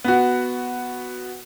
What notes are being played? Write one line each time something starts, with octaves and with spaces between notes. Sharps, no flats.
B3 F#4